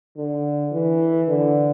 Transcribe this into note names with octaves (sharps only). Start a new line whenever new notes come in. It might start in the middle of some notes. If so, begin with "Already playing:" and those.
D3
E3
D3